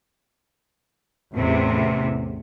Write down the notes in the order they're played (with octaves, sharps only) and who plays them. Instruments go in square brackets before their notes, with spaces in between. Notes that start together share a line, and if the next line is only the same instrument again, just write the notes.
[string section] A1 E2 C3